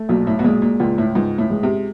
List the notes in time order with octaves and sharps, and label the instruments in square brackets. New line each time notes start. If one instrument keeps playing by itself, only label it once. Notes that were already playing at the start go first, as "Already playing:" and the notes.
Already playing: [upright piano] A3
[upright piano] B1 [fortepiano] A#2
[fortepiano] A2
B2
[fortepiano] A#2 [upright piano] G#3
[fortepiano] A#2
[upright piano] C#2 [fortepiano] A#2
[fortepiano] A2
[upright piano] C#2 [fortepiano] G#2
[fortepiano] A2
[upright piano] G#3
[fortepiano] C3